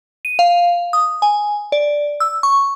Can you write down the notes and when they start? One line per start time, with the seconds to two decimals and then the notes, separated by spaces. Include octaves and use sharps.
0.25 D#7
0.39 F5
0.93 D#6
1.22 G#5
1.72 D5
2.20 E6
2.43 C#6